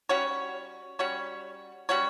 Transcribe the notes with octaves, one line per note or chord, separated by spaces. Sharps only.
G3 C#4 F#4 C#5
G3 C#4 F#4 C#5
G3 C#4 F#4 C#5